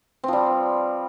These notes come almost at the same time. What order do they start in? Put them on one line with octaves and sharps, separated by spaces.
C4 F3 G3